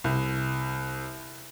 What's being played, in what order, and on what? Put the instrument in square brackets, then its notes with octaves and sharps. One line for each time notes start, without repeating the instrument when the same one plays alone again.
[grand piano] C2